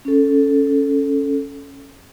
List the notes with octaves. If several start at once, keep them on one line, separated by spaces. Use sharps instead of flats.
C#4 A4